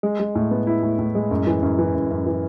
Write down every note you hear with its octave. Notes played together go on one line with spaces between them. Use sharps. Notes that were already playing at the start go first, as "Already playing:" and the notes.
G#3
G#3
A2
B3
E4
A2
A2
G#3
F#2
E3
F#2
E3
F#2
F#2
E3